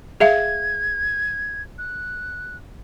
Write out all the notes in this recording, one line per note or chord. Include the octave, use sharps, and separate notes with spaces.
G#4 E5 F5 G#6
F#6